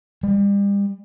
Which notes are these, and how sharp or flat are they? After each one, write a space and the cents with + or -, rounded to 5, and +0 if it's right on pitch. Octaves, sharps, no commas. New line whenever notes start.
G3 +40